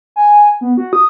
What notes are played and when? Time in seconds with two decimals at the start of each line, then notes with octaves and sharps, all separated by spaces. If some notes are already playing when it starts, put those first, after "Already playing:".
0.16 G#5
0.61 B3
0.77 F#4
0.93 D#6